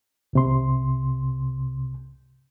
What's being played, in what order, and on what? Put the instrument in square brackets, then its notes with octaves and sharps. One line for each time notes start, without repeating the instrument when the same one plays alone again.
[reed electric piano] C2 C3 C6